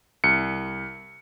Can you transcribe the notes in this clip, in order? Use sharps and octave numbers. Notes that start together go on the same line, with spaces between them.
C2 C#7